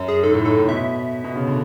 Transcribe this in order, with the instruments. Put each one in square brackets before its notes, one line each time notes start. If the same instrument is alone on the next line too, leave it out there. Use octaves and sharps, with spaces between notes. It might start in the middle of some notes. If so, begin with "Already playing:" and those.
Already playing: [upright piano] F#2
[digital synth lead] G#4
[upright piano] G#2 [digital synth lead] A4
[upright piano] A2
[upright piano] G#2 [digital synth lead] A4
[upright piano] A2
[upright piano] B2 [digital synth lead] E5
[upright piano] B2
C#3
D3